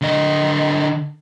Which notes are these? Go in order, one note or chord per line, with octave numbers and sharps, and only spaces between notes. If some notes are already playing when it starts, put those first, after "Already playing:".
D3 D#5